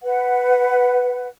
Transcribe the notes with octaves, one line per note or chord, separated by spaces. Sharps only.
B4 F#5